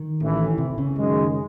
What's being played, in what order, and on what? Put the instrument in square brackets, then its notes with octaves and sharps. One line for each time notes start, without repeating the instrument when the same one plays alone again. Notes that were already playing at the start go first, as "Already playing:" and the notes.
Already playing: [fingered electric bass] D#3
[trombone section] A1 A2 E3
[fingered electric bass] C3
C#3
[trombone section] F#2 D#3 G#3